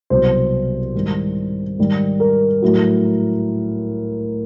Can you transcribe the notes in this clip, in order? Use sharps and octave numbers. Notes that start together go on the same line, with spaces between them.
C2 B2 F#3 C5
G#2 D#3 G3
G#2 D#3 G3
A#4
A2 F#3